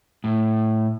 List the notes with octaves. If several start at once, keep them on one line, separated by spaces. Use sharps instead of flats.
A2